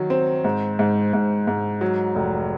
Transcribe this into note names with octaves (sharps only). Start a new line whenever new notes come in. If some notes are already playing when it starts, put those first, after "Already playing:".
Already playing: D#3 F#3
C4
G#2
G#2
G#2
G#2
F#3
F1